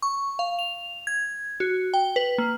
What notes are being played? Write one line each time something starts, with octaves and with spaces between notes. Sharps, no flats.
C#6
F5
F7
G#6
F#4
G5
B4
A#3